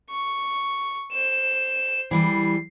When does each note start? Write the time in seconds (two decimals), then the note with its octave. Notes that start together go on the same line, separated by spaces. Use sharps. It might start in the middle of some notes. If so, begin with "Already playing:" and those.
0.10 C#6
1.12 C5 E7
2.11 E3 G3 C7